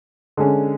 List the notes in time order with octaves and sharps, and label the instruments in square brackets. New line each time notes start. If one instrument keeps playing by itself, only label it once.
[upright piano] D3 G#3 C#4